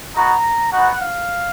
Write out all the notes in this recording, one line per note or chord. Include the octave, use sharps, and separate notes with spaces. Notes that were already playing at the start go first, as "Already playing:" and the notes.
B3 D#4 F#4 A#5
B3 D#4 F#4 F#5
F5